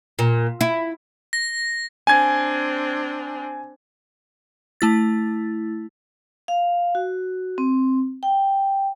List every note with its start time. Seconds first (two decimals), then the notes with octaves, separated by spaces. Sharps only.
0.19 A#2
0.61 E4
1.33 A#6
2.07 C4 D4 G#5 G#6
4.81 A3 E4 A6
6.48 F5
6.95 F#4
7.58 C4
8.23 G5